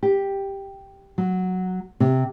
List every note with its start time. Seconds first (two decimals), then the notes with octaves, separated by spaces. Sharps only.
0.03 G4
1.18 F#3
2.00 C3